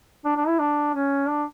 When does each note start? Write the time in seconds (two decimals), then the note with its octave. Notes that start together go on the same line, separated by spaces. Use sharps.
0.25 D4
0.36 D4
0.48 E4
0.59 D4
0.94 C#4
1.28 D4